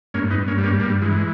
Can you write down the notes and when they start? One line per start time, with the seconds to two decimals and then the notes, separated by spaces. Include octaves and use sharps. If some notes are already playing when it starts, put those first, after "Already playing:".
0.14 G2 A#3 C#4
0.30 B3 D#4
0.36 G2
0.48 A#3 C#4
0.58 G3
0.64 A#3 C#4
0.80 G2 A#3
1.02 E3 G#3
1.15 G#3